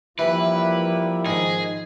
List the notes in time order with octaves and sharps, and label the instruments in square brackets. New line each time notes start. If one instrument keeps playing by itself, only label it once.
[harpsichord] E3 [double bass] F3 [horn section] G3 A#3 E4 [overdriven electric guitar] B4
[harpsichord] G#2 D#3 [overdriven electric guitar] G#4